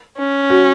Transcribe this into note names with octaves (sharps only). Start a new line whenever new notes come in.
C#4
F#4